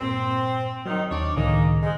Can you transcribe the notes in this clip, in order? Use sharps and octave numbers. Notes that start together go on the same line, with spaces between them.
G2 A#2 C4
D#3 F#3 C4 D#4
D#2 D4 C#5 D5
C#2 A2 D#3 G#3 A#3 D#4
G#2 G#3